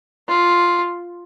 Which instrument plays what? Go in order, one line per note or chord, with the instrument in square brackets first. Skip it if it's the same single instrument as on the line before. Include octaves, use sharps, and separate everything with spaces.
[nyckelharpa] F4